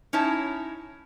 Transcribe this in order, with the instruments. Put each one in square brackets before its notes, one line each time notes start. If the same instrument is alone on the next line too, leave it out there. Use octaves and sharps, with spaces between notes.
[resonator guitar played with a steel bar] C#4 D#4 E4 C#5 A5